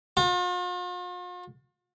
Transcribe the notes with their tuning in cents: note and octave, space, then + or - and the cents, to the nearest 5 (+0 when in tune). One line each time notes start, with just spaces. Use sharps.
F4 +45